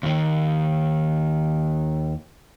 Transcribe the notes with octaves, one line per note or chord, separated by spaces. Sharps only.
D#2 D#3